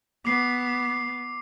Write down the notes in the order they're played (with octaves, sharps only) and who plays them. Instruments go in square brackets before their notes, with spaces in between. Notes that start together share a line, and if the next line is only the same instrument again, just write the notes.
[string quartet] B3 [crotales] D6 C7